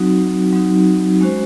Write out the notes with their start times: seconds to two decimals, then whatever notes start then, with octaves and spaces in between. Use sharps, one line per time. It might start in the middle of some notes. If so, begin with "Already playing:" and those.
Already playing: F#3 C4 D#4 F#4
0.53 F#3 C4 D#4 F#4
1.21 G#3 C#4 F#4 C5